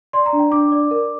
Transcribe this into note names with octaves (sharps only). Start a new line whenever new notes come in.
D5 C6
A#5
D4
G5
D4 D6
D5
A#4